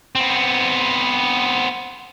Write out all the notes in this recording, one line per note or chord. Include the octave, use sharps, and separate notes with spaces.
B3 C4